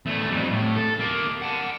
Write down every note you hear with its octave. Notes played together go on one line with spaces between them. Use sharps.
E2 A3
F2 G3
A2
A4
A#3 G4
F#5 A5